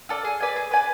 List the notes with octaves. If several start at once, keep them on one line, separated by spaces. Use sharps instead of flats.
F4 A4 D5
G#4
B4 D5 G#5
G#4
B4 D5 G#5